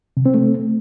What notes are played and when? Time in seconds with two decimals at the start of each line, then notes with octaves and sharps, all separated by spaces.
0.17 C3
0.26 C4
0.34 A3